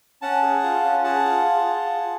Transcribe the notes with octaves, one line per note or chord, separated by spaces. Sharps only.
C#4 F#5 A5
G#4
F4
C#4
G#4 F#5 A5
F4
G#4
F4
G#4